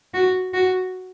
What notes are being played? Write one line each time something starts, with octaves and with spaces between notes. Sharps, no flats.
F#4
F#4